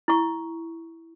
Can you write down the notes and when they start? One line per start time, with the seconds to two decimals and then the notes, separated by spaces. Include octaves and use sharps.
0.08 E4 C#6